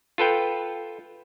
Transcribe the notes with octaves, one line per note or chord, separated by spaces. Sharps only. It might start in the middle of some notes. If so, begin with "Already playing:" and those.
F4 A4 B4 G5